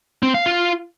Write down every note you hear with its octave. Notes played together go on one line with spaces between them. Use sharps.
C4
F5
F4